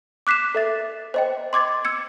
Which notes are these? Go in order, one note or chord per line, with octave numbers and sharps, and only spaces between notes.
D6 F#6 B6 C7 E7
A4 E5 A6
C5 D#5 G5
C6 D6 G#6 A6
E6 G#6 C#7